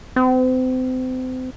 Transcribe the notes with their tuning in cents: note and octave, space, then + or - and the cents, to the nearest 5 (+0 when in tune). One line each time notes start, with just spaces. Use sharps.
C4 -35